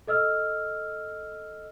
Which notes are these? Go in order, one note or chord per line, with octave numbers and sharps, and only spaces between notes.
A4 D#5 E6 F6